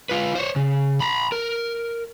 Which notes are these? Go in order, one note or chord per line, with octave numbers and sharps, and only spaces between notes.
F4 B4
C5 C#5
C#3
A#5 B5
A#4